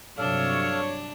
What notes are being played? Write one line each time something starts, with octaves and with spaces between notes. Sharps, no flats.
G2 C3 F#3 D4 A4 C#5 F5